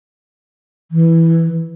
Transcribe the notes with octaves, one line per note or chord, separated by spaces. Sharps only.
E3